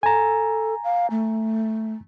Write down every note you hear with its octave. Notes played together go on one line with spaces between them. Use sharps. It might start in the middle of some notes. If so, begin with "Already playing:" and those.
A4 G#5 A#5
F5
A3